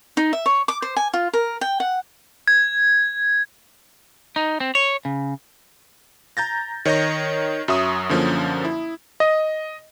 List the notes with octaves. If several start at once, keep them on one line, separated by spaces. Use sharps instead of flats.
D#4
E5
C#5
D6
C5
G#5
F4
A#4
G5
F#5
G#6
D#4
C4
C#5
C#3
A#5 G6 A6 A#6
D#3 C#5 D#5 G6 A#6
F#2 F#3 E5 C#6 D#6
F#2 D3 F3 A#3 C#4
E4
D#5